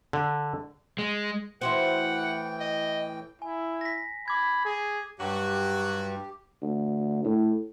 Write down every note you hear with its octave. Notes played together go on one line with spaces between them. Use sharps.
D3
G#3
A2 E3 E4 F#4 C5 F#5 G5
D#5
E4 G#5
A#6 B6
B5 D6 G#6
G#4
G2 F#3 F#4 G4
D2
A2